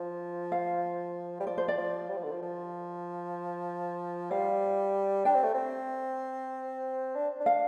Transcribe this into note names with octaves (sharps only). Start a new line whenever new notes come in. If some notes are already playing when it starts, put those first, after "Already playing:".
Already playing: F3
F5
G3
F3 D5
C5
D5
F3
G3
F3
D3
F3
F3
G3 F5
D4 G5
C4
A3
C4
D4
D4
F5